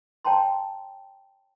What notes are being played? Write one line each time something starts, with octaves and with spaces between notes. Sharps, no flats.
C#5 G5 A5 A#5 C6